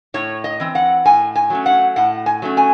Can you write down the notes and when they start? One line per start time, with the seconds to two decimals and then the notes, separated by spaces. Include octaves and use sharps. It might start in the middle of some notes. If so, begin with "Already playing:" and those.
0.14 A2 C#5
0.44 D#5
0.60 E3 C4
0.75 F#5
1.05 A2 G#5
1.35 G#5
1.50 F#3 A3 C#4
1.66 F#5
1.96 A2 F#5
2.26 G#5
2.42 F#3 A3 C#4
2.57 G#5